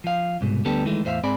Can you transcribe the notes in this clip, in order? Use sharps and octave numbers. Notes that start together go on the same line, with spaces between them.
F3 F5
C2 G#2 B2
D2 D3 G3 B3 G4 A4
D#3 E3 G#3 A3
E2 A2 C5 E5 F5
G#2 C4 G#4 D5 B5